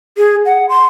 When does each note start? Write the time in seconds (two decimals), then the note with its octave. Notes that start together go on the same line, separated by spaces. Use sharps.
0.17 G#4
0.45 F#5
0.69 C6